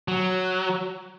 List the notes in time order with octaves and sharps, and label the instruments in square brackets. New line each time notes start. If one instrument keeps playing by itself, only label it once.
[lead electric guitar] F#3